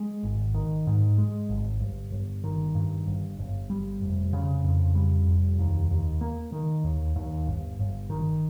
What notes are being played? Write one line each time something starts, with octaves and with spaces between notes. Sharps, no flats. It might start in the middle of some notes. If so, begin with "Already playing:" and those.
Already playing: G#3
G#1
D#3
G#2
G#3
G#1
G1
G1
D#3
G2
G1
G1
G3
F1
C#3
F2
G3
F1
D#2
D#2
A#3
D#3
D#2
D#2
G1
G1
D#3